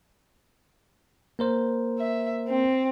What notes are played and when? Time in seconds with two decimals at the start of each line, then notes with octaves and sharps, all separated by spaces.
1.39 A#3 A#4 C5
1.99 E5
2.48 C4